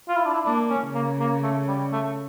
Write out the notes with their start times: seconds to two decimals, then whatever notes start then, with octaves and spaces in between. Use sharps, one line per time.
0.09 F4
0.17 E4
0.26 D4
0.34 E4
0.45 A#3 D4
0.70 C#4
0.82 C#3
0.95 A#3
1.20 A#3
1.43 A3
1.68 G3
1.93 A3